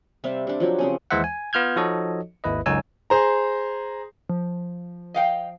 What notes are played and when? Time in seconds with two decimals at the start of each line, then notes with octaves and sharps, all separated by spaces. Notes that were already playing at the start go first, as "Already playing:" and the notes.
0.24 C3 G3 E5 F5
0.47 C3 D4
0.60 F3 F#3 G4
0.79 C#3 C4 C#4
1.11 D#2 E3 G#3 C5 E5 F#5
1.24 G#5
1.53 B3 F4 F6 G6 G#6
1.76 F3 D#4 F#4 A4 C#5 D#5
2.44 G#1 D#2 E4 B4 D#5
2.66 C#2 F#2 D#4 C#5 G#5 E6
3.10 G#4 C5 A#5
4.30 F3
5.14 D#5 F5 G5